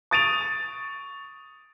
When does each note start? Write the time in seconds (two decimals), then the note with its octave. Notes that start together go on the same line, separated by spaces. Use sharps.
0.11 C#6 D#6 A6 D7 D#7 F7